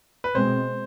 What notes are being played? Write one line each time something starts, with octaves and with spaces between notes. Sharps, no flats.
B4
B2 G#3 C4 C5